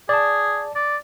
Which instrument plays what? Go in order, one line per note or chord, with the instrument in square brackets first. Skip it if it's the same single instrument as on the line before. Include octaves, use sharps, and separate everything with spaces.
[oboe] G#4 [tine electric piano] D5 A5
[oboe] D5